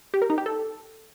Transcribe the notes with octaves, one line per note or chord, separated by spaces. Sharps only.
G4
A#4
D#4
G4
A4